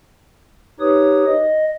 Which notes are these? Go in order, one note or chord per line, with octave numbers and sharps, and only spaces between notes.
D#4 G4 B4 C#5 D#6
D#5